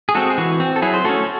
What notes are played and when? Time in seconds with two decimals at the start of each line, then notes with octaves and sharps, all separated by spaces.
0.09 G#4
0.15 G#3 C4 F#4 A4
0.30 G#4
0.38 E3 F#4
0.60 C4
0.76 A4
0.82 F#3 E4 G#4
0.94 C5
1.04 A3 C#4 F#4 A4